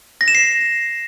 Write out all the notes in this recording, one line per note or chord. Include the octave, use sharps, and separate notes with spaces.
A#6
E7
C7